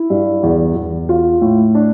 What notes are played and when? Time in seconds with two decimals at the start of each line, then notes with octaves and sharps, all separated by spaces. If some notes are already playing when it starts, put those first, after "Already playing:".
Already playing: E4
0.10 G2
0.43 E2
0.76 E2
1.09 F4
1.41 A2
1.75 D4